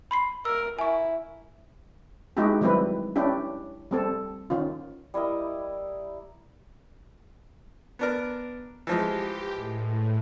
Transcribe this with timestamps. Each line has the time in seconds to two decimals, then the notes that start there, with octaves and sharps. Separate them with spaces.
0.11 B5 C6 C7
0.45 A#4 E6
0.79 E4 G#5 C#6
2.37 G#3 D#4 E4 F#4 G4
2.61 D#3 F#3 G3 C4 E4 B4
3.16 C#4 D4 E4 G4
3.91 G3 C4 A4
4.50 D#3 C#4 F4
5.14 G3 E4 A#4 D#5
7.99 B3 D4 A#4
8.87 E3 F3 G#3 G4
9.54 A2